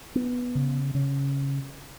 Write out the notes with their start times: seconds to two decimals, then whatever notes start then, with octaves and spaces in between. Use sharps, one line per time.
0.15 B3
0.55 C#3
0.95 C#3